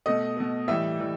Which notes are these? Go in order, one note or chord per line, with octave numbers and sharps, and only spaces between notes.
B2 A3 D#5 D#6
B2 A3
A2 E3 G3 E5 E6
E3 G3